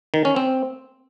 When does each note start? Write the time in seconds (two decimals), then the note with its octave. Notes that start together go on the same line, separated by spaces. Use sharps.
0.14 D#3
0.25 C#4
0.36 C4